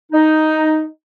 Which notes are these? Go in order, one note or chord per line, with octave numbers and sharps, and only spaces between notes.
D#4